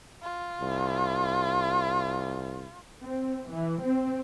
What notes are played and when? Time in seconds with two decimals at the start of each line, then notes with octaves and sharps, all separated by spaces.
0.22 F4
0.61 C2
3.04 C4
3.50 E3
3.82 C4